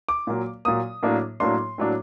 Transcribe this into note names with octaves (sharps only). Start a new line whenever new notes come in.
D6
A#2 F#3 A#3
A#2 F#3 A#3 D#6
A2 F#3 A#3 D4
A2 F#3 A#3 D4 C6
A2 F#3 A#3 D4